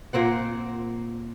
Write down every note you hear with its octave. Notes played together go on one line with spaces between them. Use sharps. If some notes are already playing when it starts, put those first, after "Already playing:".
A#2 A#3 C4 F#5